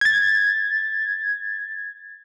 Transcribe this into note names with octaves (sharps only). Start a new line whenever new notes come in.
G#6 A6